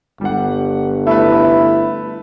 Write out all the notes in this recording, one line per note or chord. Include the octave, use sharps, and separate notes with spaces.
G1 G3 F#5
A3 E4 B4